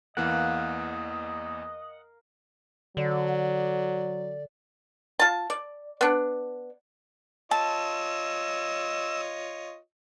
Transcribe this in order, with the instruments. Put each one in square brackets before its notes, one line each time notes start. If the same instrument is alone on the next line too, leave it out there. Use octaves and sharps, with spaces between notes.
[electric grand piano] E2 E3 A#3 [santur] A#4 F5 [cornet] D#5 [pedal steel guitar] F#5
[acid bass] D3 [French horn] F#3 [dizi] D5
[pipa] F4 A5
D5
B3 D4
[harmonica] F4 C#5 D#5 [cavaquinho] A5 [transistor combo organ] E6